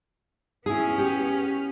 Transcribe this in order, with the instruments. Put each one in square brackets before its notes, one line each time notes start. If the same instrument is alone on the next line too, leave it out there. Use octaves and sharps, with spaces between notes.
[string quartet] B3 C#4 F6 [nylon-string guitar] E4 G#4
[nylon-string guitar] G4